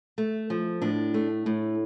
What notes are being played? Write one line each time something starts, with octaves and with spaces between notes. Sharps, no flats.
A3
F3
A2 D4
A3
A2